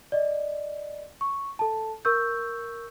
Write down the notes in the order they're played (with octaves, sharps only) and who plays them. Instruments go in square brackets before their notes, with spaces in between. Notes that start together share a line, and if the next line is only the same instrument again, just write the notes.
[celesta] D5 D#5
C#6
A4 A5
A#4 C#6 E6 G6